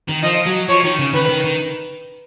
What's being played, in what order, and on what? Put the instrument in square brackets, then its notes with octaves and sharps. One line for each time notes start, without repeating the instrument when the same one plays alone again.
[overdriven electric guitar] D#3
[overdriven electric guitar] F3 [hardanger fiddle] D#5
[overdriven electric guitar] F#3
[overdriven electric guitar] F3 [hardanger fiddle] C#5
[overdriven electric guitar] D#3
C#3
[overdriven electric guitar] D#3 [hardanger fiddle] B4
[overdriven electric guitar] D#3
D#3